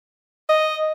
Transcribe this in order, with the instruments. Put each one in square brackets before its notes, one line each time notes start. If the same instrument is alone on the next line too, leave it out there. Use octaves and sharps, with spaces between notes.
[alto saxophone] D#5